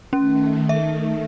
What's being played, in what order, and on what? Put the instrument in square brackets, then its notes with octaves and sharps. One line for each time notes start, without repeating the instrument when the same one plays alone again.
[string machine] D#3 A3 [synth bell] C#4
[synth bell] E5